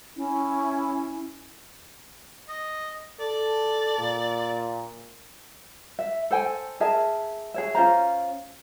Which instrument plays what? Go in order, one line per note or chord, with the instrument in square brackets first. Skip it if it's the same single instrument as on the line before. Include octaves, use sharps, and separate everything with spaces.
[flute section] C#4 E4
[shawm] D#5
[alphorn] A4 [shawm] D5
[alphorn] A#2
[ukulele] E5
A4 C5 G5 G#5
G#4 A#4 E5 A5
G#4 C#5 E5
C#4 F4 C5 A#5